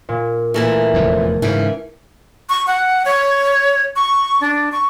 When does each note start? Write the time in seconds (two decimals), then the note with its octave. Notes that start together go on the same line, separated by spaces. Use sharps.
0.09 A#2
0.54 A#2 E3 A3 A4 A#4
0.94 F1 E2
1.42 G#2 C#3 E3
2.50 C#6
2.67 F#5
3.06 C#5
3.96 C#6
4.41 D4
4.72 C#6